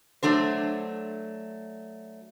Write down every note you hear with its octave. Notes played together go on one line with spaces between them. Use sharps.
F#3 A3 D4 C5